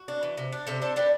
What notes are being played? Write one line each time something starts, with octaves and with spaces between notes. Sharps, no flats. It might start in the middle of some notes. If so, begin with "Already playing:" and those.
Already playing: F#4
D4
E3
C3
D4
C3 A4 C5
D4 A4 C5
D4 G4 B4